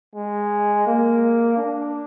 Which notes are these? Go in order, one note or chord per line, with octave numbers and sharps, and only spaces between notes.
G#3
A#3
D4